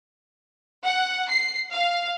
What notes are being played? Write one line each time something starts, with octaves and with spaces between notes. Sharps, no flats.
F#5
C7
F5